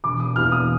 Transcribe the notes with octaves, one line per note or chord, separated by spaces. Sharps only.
E1 D6
D#6
E2 F6
D#6